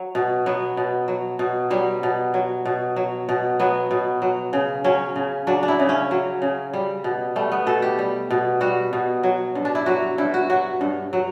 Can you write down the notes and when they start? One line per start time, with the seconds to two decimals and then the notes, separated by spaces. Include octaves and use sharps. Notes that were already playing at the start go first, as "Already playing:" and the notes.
Already playing: F#3
0.15 B2
0.46 F#3 B3
0.77 B2
1.08 F#3
1.39 B2
1.70 F#3 G3
2.03 B2
2.34 F#3
2.65 B2
2.96 F#3
3.29 B2
3.60 F#3 B3
3.91 B2
4.22 F#3
4.53 C#3
4.84 F#3 C#4
5.16 C#3
5.47 F#3 D4
5.63 D4
5.68 E4
5.80 C#3
5.89 C#4
6.11 F#3
6.42 C#3
6.73 G3
7.04 B2
7.36 G3 A3
7.52 B3
7.66 B2 A4
7.82 G4
7.99 G3
8.30 B2
8.61 G3 F#4
8.93 B2
9.23 F#3
9.55 G2
9.65 D4
9.75 E4
9.86 F#3 F#4
10.18 G2 E4
10.34 F#4
10.50 F#3 F#4
10.81 G2
11.13 F#3